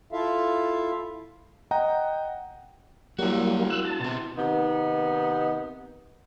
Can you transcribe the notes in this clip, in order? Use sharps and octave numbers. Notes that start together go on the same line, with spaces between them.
E4 F4 A4 E5 F5
D#5 F#5 G5 A#5
F#3 G3 A#3 E4 F#4
E6 F#6
A5
B2 C4
C3 D#3 B3 D#4